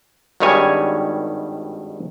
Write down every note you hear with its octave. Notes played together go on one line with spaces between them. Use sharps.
G#1 G2 D#3 G3 C#5 G#5